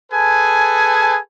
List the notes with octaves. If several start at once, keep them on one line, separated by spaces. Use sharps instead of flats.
G#4 A4 B4 G#5 A5